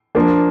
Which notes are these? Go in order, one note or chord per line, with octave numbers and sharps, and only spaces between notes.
F3 A#3 D4